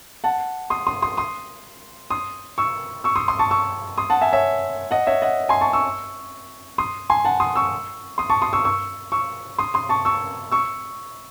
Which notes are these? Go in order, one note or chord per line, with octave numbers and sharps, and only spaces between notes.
F#5 A5
C6 D#6
C6 D#6
C6 D#6
C6 D#6
C6 D#6
C#6 E6
C#6 E6
C6 D#6
C6 D#6
A5 C#6
C#6 E6
C6 D#6
F#5 A5
E5 G#5
C#5 E5
D#5 F#5
C#5 E5
D#5 F#5
G#5 C6
A5 C#6
C#6 E6
C6 D#6
G#5 C6
F#5 A5
C6 D#6
C#6 E6
C6 D#6
A5 C#6
C6 D#6
C#6 E6
C#6 E6
C#6 E6
C6 D#6
C6 D#6
A5 C#6
C#6 E6
C#6 E6